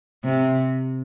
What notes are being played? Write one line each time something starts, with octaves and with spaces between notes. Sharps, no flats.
C3